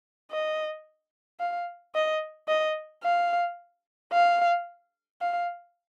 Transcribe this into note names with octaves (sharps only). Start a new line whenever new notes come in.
D#5
F5
D#5
D#5
F5
F5
F5